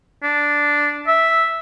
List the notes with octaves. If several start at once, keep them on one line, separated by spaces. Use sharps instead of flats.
D4
E5